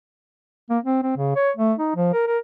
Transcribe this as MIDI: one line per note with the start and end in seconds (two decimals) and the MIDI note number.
0.70 0.78 58
0.84 1.02 60
1.03 1.17 60
1.17 1.31 49
1.36 1.51 73
1.57 1.73 57
1.79 1.92 63
1.96 2.13 53
2.13 2.25 70
2.27 2.38 70